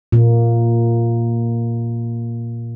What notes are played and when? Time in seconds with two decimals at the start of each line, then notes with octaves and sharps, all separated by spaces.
0.12 A#2 A#3